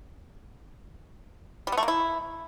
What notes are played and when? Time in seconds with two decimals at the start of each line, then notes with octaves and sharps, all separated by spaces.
1.67 G3
1.72 B3
1.77 A3
1.83 A#3
1.88 E4